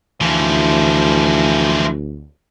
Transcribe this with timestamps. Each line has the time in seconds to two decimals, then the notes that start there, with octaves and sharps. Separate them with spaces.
0.21 D2 E3 F3